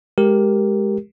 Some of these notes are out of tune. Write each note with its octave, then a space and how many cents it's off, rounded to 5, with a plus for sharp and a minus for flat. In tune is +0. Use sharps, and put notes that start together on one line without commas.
G#3 +0 G4 +0 A#4 +0